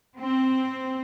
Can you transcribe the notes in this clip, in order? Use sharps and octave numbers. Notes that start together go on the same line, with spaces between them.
C4